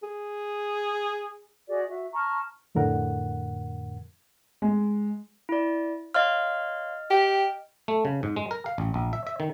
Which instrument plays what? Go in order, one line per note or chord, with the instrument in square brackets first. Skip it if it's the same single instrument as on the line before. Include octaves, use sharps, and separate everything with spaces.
[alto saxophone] G#4
[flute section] F#4 G#4 D5 D#5
F#4 E5
A5 A#5 C#6 F6
[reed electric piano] F2 A2 D3 A#4 F#5
[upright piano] G#3
[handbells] E4 D5
[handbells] C#5 F5 C6 [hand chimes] D#5 F6
[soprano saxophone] G4 [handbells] G5
[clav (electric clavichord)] A3
C#3
G#2
G#3
A#4
F5
A1
A#1
E5
E5
D#3